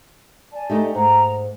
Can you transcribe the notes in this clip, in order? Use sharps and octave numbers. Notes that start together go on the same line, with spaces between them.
D5 G#5 A5
A3 D#4 G4
G#2 A#5